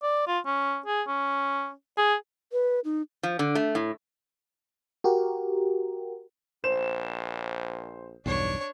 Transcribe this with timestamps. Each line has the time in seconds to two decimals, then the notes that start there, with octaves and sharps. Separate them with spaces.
0.02 D5
0.27 F4
0.46 C#4
0.86 G#4
1.08 C#4
1.98 G#4
2.52 B4
2.84 D#4
3.23 F3
3.39 D3
3.55 A3
3.75 A2
5.04 F#4 G4 A#4
6.64 A#1 C5 E7
8.26 B1 E2 G2 D4 C#5